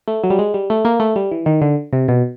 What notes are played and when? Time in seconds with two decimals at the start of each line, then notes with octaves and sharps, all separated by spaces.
0.08 A3
0.24 F#3
0.30 G3
0.39 G#3
0.54 G3
0.70 A3
0.85 A#3
1.00 A3
1.16 G3
1.31 E3
1.46 D#3
1.62 D3
1.93 C3
2.08 B2